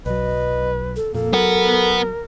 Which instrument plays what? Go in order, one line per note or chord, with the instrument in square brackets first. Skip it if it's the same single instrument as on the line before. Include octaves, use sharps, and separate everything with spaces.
[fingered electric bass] B1 F#3 [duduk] B4 [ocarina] D#5
[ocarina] A4
[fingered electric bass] F2 A#2 [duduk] A#3 [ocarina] A4
[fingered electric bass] F#3 [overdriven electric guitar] B3 F#5 [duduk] A#4